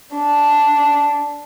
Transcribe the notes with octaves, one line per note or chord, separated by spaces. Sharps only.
D4